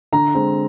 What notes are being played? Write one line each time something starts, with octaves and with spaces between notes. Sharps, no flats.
D3 A#5
G#3 C4